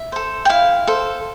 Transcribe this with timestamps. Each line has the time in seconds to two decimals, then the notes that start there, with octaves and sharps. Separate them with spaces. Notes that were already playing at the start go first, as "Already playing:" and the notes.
Already playing: E5
0.12 A4 C5
0.45 G5
0.49 E4 F5
0.88 A4 C5